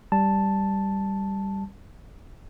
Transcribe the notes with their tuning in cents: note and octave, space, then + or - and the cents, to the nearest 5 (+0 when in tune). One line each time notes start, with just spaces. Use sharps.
G3 +0 A5 +0